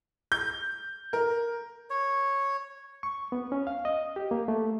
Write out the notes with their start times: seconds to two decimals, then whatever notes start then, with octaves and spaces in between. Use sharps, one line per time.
0.32 G6
1.13 A#4
1.90 C#5
3.03 C#6
3.32 B3
3.52 C#4
3.67 F5
3.85 D#5
4.16 G4
4.31 A#3
4.48 A3